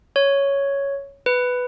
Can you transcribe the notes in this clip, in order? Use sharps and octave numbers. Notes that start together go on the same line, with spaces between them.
C#5
B4